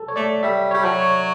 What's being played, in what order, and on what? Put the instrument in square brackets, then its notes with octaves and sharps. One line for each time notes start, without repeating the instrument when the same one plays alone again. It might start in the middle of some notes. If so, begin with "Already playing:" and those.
Already playing: [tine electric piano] A4
C#5
[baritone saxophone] A3 [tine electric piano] D5
[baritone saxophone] G3 [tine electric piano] E5
[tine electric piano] C#5
[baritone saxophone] G3
F#3
[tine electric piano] C#5